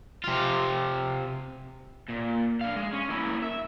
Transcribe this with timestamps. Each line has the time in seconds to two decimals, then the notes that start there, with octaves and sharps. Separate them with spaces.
0.24 C3 F4
2.08 A#2
2.61 D4 F5
2.76 G#3
2.93 C#4
3.10 A#3 E4
3.42 E5